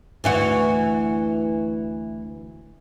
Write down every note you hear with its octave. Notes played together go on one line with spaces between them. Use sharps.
D2 E3 F#4